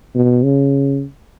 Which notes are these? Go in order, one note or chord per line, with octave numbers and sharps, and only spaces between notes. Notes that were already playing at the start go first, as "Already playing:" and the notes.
B2
C#3